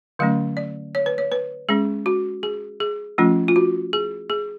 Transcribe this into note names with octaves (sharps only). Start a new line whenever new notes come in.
D3 F#3 A3 C#4 F5
D5
C#5
B4
C#5
B4
G#3 C#4 G#4
F#4
G#4
G#4
F3 A3 C#4 F4
F4
F#4
G#4
G#4